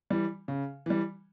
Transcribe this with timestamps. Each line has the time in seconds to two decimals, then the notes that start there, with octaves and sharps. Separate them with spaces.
0.10 E3 G3
0.48 C#3
0.86 E3 G3